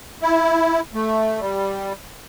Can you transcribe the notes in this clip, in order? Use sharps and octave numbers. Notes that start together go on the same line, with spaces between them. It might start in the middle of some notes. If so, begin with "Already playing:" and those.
E4
A3
G3